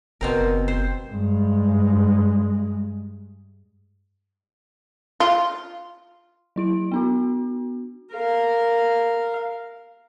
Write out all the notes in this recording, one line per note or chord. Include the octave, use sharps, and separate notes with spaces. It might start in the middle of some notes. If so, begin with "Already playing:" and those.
F#1 B2 C4 A#4
C5
G2 G#3
F4
F#3 E4 D7
B3 D4 F#4
A#4 F5